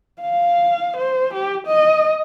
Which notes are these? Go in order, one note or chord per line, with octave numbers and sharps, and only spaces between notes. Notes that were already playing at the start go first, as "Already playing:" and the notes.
F5
C5
G4
D#5